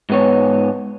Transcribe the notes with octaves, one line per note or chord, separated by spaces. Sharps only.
G#2 B3 C#5